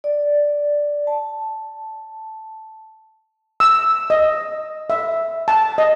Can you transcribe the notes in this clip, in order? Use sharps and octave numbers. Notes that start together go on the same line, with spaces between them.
D5
A5
E6
D#5
E5
A5
D#5